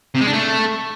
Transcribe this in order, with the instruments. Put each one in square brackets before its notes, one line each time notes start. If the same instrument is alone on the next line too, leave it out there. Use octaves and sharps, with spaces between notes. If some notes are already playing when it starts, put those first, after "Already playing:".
[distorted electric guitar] C3
G#3
D4
A3